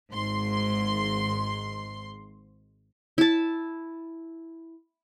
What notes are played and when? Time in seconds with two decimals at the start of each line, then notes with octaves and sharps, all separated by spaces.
0.11 G#1 G#2 C6
3.18 E4 A5